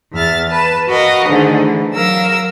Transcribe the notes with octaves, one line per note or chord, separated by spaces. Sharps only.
E2 E5 F6 A6
B4 A5
F#4 A#4 B4 D#5 F5
G#2 D3 D#3 A3
E3
F#3 A#4 F5 E6